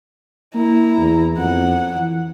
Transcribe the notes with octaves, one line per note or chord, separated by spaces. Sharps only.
A#3 E4 A#5
E2
F2 F#5
E3